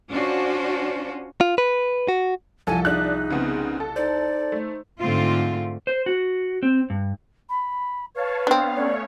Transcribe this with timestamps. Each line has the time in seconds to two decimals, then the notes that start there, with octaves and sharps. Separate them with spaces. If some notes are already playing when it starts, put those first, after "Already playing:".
0.10 C#4 D4 F4 F#4 C5
1.41 F4
1.58 B4
2.08 F#4
2.67 C2 F3 A4 G#5
2.85 D4 D#4 G#4 E5 F#6
3.30 C#3 B3 C4
3.80 A4
3.96 D#4 C5 D5
4.52 A3
5.00 G#2 D3 A3 C4 F4
5.87 C5
6.06 F#4
6.63 C4
6.90 G2
7.49 B5
8.15 B4 C#5 F5 A5
8.47 B3 C4 D4 F5
8.76 A3 C#4 C#5 D5